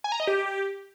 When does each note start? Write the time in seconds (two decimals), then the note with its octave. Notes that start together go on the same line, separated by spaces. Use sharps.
0.04 G#5
0.12 A#5
0.20 D#5
0.27 G4